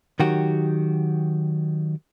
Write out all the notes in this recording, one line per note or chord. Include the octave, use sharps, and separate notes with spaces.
D#3 F#3 F#4 G4